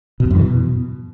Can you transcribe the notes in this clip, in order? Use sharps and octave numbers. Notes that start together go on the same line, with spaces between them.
B2
E2
F#2
E3
B2